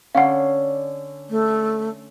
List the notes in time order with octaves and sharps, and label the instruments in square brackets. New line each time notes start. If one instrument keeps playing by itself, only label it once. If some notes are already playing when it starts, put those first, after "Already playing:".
[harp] D3 C#4 [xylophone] F5 F#5
[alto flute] A3